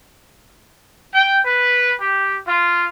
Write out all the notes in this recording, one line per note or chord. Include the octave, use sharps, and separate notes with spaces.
G5
B4
G4
F4